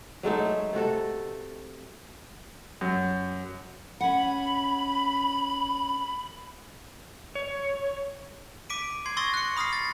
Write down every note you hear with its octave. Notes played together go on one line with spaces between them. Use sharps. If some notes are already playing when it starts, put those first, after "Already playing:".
F#3 G#3 A3 D#4
E5
C3 A3 F#4 A4
F#2
C#4 F#5 B5
C#5
D6 B6 D7 D#7
C6 G#6 C7
C6 C#6 D#6 E6 A6 A#6
F#6 C#7
B5 D#6 F6 A#6 C7
A6